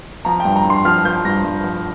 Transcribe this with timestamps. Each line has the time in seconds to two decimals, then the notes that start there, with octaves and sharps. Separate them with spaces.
0.25 F3 A#5
0.40 G5
0.45 G2
0.56 A#5
0.65 G2
0.70 C6
0.85 F3 F6
1.05 F3 G6
1.25 G2 A#6
1.44 G2
1.64 F3